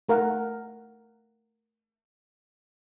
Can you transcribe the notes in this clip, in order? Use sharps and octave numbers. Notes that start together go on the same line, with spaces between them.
A3 A#4 F5 F#5